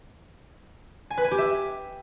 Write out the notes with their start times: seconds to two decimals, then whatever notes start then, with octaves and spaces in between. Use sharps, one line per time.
1.10 G#5
1.17 B4
1.24 G#5
1.31 G4
1.38 E5